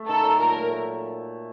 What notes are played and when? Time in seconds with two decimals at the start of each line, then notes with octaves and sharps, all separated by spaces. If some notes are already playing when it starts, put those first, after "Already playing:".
Already playing: A3
0.08 D#3 A4
0.23 F#3
0.39 A#2 A#4
0.54 A3
0.70 A3